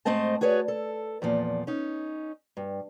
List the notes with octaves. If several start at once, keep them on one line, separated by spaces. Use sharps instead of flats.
G#2 A3 C4 C5 D#5 A5
F#4 G#4 B4 C#5 D5
A4
E2 A#2 F3
C#4 D#4
G2